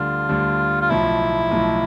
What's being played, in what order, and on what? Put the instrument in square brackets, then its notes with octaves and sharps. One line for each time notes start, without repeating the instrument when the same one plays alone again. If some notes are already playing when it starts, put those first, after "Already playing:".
Already playing: [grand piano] D2 D3 G3 D4 [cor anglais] F4
[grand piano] D2 D3 G3 D4
[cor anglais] F4
[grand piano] B1 A2 F3 [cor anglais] E4
[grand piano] B1 A2 F3